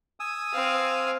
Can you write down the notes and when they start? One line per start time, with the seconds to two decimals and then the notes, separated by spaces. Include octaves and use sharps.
0.20 G#5 D#6 E6
0.53 C4 F5